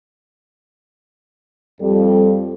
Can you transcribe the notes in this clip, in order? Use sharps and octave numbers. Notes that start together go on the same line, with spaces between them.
F2 G3 A4